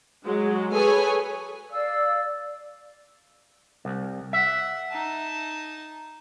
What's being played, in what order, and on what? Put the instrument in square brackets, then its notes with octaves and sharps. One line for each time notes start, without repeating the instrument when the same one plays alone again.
[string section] F#3 G#3
G#4 A4 B4 C#5 G#5
[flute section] D5 F5 E6
[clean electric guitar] C2
[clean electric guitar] E5 [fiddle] F#5
[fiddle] D#4 A5